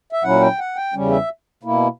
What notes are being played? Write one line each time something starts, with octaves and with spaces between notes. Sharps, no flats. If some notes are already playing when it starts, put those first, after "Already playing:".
E5
A#2 F#3 C#4 E4 F#5
G5
F#5
G5
E2 C#3 G3 C#4
E5
B2 A#3 E4